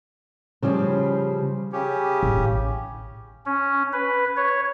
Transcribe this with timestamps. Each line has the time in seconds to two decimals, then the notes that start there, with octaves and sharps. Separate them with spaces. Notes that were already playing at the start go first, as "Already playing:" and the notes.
0.62 C#3 F3 G3
1.73 C#3 C#4 G4
2.23 A1
3.46 C#4
3.93 B4
4.37 C#5